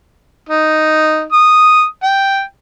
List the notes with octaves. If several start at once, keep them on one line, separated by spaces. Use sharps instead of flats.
D#4
D#6
G5